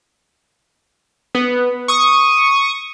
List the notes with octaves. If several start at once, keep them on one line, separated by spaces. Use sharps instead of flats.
B3
C#6 D#6